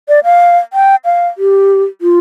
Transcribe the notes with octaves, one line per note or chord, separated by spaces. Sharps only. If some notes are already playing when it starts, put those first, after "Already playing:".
D5
F5
G5
F5
G4
F4